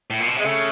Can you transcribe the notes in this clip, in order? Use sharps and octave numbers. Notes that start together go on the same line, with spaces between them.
A2
A#2
B2
C3 G#3
C#3 A3